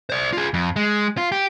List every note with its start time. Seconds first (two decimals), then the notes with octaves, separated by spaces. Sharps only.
0.10 C5 D5
0.33 F4 G#4
0.54 F2
0.76 G#3
1.17 F4
1.32 G4